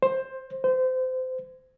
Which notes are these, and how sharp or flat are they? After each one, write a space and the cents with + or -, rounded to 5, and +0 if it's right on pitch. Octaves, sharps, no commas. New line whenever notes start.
C5 +15
C5 -25